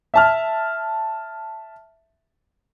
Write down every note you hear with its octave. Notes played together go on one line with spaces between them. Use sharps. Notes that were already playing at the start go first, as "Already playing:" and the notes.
E5 A5 F6